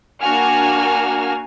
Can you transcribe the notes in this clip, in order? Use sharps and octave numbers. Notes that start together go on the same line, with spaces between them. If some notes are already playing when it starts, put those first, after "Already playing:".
A#3 D4 F#4 G#5 F6